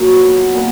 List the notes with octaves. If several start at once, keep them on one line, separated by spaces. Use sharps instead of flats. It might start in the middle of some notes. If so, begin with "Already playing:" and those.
Already playing: A#2 F#3
B3
A#2